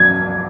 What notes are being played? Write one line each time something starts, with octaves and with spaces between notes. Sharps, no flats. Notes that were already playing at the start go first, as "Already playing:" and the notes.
Already playing: F#3 G#6